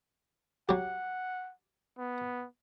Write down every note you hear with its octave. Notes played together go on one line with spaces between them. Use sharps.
F#3 G4 F#5
B3